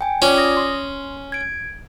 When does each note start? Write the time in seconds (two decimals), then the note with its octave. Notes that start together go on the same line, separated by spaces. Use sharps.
0.01 G5 G#5
0.22 C#4 F4 D5 D6
0.37 D#6 A#6
0.57 C6
1.32 G#6 D7